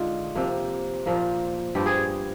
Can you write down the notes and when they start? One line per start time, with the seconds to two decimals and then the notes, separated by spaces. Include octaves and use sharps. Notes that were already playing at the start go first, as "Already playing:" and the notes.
Already playing: D3 G#3 D#4 F4
0.35 C3 F3 A#3
1.06 A#2 F3 A#3
1.75 G2 F3 C4 G4
1.86 G#4